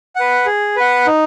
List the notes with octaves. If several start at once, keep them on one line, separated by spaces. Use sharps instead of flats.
B4 F#5
G#4
B4 F#5
D#4